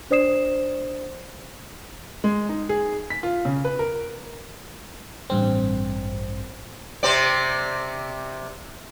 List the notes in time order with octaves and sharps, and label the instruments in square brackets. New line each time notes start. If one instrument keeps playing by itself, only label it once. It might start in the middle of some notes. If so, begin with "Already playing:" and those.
[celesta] D4 C5 D5 D#6 C7 E7
[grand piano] G#3
D#4
G#4
B6
F4
C#3
B4
A#4
[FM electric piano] A1 G2 C4
[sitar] C3 C4 D5